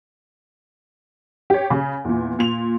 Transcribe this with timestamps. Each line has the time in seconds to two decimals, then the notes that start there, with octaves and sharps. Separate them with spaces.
1.50 G4 C#5
1.70 C#3
2.05 E2 A#2
2.39 A#2 F7